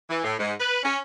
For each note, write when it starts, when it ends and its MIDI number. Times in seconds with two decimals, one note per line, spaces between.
0.09 0.22 52
0.24 0.33 45
0.39 0.54 44
0.59 0.83 71
0.83 0.99 61